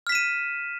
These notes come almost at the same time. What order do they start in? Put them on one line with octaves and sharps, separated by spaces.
F6 B6 E7 D#7